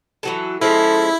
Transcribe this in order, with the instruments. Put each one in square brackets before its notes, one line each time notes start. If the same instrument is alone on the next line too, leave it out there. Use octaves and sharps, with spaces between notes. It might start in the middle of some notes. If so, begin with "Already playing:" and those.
[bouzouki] E3 F#3 A4
[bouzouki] F3 G#3 C#4 [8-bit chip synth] E4 [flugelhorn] A4